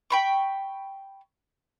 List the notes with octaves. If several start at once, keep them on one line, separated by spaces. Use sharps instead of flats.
G5 B5 C#6